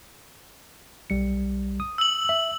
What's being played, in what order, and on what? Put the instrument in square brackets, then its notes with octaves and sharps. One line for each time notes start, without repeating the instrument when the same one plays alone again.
[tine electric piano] B1 G3 C#7
D#6
[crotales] E6 F#7
[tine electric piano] E5